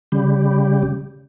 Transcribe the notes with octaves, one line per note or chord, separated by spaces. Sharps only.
C#3 G3